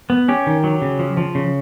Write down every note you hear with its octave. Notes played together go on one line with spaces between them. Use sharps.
B3
C#4 G4
D#3
F#3
C#3
F3
F3
C#3